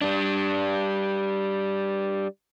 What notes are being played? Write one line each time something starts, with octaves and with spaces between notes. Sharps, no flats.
G3 D4